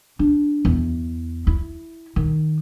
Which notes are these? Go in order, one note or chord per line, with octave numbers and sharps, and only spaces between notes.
D4
E2
E4
D#3